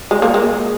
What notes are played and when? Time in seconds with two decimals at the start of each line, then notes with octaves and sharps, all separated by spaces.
0.11 G#3
0.22 A#3
0.34 G#3